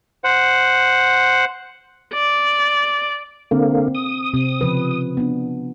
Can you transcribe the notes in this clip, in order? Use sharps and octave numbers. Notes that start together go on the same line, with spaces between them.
C5 F#5
D5
D3 A#3 C4
D#6
C3 C4
C#3 F3 B4
B3 D4